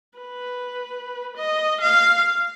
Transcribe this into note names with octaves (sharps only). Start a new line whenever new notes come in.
B4
D#5
F5